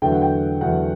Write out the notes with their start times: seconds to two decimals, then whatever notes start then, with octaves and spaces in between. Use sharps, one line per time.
0.02 E2 D3 F#3 A3 G5
0.12 F#5
0.22 G5
0.61 E2 D3 F#3 A3 F#5